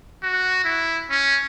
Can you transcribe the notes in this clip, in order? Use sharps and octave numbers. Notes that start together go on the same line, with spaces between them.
F#4
E4
C#4